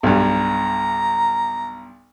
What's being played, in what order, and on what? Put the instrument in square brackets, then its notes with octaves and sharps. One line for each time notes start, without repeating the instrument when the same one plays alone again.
[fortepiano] B1 G2 [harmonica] A#5